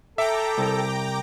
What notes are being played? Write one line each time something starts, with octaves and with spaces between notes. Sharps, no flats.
A4 E5 G5 A#5 D6
C2